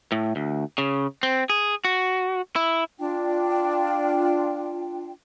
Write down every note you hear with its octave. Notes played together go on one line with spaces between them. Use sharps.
A2
D2
C#3
C4
G#4
F#4
E4
D4 F4 G5